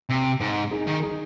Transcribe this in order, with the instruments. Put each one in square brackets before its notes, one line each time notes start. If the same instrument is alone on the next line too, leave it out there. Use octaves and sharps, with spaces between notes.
[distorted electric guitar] C3
G#2
[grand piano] D#4 G#4
[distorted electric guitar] D#3
[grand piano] D#4 G#4